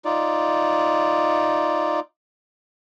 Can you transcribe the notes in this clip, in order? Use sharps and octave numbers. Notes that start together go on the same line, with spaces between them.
D#4 F4 D5